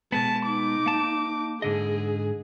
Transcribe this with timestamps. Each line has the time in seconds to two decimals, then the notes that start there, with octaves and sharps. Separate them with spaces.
0.12 B2 G#3 B3 A5
0.46 D#4 D6
0.86 A#3 A5
1.62 G#2 D3 G#4 D#5